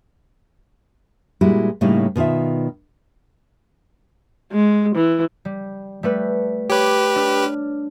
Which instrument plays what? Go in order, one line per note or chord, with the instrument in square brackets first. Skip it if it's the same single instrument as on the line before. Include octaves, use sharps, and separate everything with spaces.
[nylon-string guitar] A#2 G3 G#3 E4 F#4
A2 C#3 G3 A#3 D#4 E4
B2 D#3 F4 D5 E5
[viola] G#3
E3
[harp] G3
G3 A3 B4
[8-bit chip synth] G4 B4 [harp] C#5 D6
[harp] D4 F6